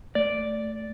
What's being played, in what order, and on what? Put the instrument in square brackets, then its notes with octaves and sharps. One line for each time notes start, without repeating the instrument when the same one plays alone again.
[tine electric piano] A3 [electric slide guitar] D5